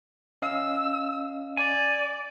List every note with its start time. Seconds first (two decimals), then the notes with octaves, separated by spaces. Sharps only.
0.42 C#4 D#5 F5 E6
1.57 D5 G#5